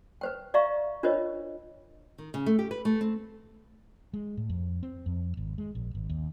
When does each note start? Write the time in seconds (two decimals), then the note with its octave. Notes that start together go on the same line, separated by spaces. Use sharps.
0.21 B4 C5 G5
0.54 D5 E5 F5 A#5 C#6
1.03 D4 F4 A#4 C5 C#5 D#5
2.18 D#3
2.34 C#3
2.46 A3
2.59 G4
2.71 B4
2.85 A3
3.01 C4
4.14 G#3
4.37 A2
4.49 F2
4.83 C4
5.06 F2
5.37 G#1
5.58 G#3
5.75 A#1
5.95 G#1
6.10 D#2